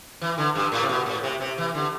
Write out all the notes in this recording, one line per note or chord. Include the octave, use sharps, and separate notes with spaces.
E3
D3
G2
A2
C3
B2
A2
C3
C3
E3
D3